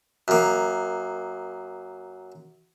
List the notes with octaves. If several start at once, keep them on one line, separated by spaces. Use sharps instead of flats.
F#2 A#3